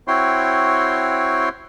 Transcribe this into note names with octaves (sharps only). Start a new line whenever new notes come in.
C4 E4 F#4 C#5 G5 C6